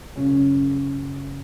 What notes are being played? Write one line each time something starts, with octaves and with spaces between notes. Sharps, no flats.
F#1 F#2 C#3 C#4